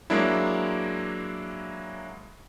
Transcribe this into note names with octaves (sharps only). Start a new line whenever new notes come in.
F#3 G#3 A#3 D4 E4